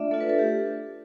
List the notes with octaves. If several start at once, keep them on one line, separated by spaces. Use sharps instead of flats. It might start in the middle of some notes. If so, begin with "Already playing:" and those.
Already playing: A3 D4 F4 D5 E5
A3 D4 F4 A4
B4
A4
G4